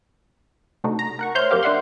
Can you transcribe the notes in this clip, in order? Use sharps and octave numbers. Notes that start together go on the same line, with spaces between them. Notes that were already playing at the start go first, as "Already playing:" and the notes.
C3 A3 D4 D#4 F#4
A#5
A#4 F#5 C#6
C5 C#5 E5 C6 F6 G6
F#2 A#3 C4 G4 F5
D4 C5 D5 E5 F#5 C6